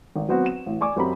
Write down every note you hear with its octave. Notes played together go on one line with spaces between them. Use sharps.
G#1
F#3 B3 C4 F#4
E7
A1
D5 G#5 C#6 D6
F#2 C4 G4 A#5 B5